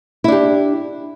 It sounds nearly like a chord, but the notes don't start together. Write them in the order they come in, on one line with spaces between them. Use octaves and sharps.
E4 D4 G4